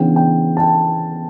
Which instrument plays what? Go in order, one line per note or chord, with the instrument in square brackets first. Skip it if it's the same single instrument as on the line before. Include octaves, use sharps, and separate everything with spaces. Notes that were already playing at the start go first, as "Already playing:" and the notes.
Already playing: [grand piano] C#3 E3 B3 D4 G5
G5
A5
G5